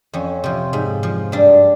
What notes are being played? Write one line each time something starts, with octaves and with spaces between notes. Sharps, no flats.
F2 C#4
C3 F3
G#2
F3
G2 D4